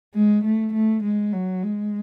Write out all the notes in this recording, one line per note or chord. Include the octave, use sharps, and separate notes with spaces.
G#3
A3
A3
G#3
F#3
G#3